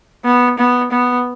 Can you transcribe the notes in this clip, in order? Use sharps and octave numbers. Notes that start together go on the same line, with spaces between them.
B3
B3
B3